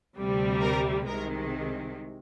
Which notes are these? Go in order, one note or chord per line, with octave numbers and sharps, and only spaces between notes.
D2 C3 G3
A#4
C2 C3 D#3 G#3 A#4